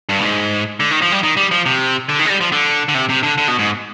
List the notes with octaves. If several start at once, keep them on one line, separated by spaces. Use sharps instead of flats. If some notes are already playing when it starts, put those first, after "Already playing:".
G2
B2
G#2
D3
D#3
F3
G3
D#3
G3
F3
C3
D3
D#3
G#3
G3
F3
D3
D3
C3
C3
D3
D3
B2
G#2